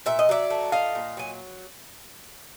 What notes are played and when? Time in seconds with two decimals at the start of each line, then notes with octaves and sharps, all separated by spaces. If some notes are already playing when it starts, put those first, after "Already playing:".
0.06 A#2 E5
0.19 D#5
0.29 F#3 D5 E5
0.50 A3
0.72 A#2 D#5 F5
0.95 A#2
1.17 F#3 G#5